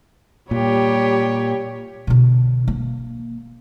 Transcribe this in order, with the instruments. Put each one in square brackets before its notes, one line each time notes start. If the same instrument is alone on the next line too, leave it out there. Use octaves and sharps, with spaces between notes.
[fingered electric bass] A#2 [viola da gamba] G3 G4 C#5
[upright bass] B2 D3
A#3